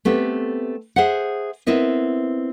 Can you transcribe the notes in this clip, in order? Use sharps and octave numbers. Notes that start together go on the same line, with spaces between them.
A3 B3 C4 G4
G#4 C5 E5 F#5
B3 C4 E4 A#4 D#5 E5